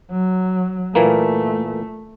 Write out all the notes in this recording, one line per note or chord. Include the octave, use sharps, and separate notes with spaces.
F#3
A#2 E3 A3 A#3